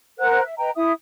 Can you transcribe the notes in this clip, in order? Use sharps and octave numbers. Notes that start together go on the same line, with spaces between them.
A#4 C5 F#5 F#6
E5
B4 D#5 G5 A#5
E4 E5 D#6